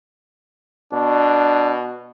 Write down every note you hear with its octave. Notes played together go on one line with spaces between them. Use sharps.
B2 D4